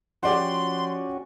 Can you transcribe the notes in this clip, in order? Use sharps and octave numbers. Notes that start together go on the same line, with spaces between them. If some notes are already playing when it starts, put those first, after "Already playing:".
F3 C#4 F#4 G4 D5 F#5 C6